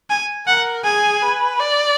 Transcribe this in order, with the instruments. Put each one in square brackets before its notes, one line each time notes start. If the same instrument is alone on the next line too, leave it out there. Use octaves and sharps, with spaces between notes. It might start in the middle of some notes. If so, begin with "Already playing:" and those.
[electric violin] G#5
[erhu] A#4 [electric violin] F#5
[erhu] G#4 [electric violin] G#5
[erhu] B4
D5